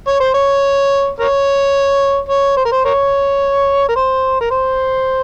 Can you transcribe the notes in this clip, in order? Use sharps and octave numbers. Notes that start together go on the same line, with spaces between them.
C#5
C5
C#5
A#4 C#5
C#5
C5
A#4
C5
A#4 C#5
A#4
C5
A#4
C5